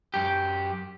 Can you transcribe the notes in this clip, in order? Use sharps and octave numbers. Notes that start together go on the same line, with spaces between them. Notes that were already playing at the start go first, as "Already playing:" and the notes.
F#2 G4